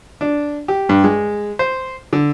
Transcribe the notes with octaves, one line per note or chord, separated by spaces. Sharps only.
D4
G4
G2
G#3
C5
D3